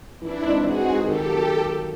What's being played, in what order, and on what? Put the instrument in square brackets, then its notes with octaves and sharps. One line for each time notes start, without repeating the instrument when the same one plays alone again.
[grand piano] E3 [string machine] D4 E4
[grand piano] G#3 C4 D#4
[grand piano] E3 [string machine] F#4 G#4
[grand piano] G#3 C4 D#4
[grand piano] D#3 [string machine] G4 A4
[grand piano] F#3 A#3